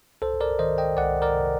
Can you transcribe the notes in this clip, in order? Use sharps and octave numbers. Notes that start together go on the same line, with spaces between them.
C2 A4 C5
A#4 D5
D#3 C5 D#5
D#5 G5
C2 D5 F#5
A#4 D5
C3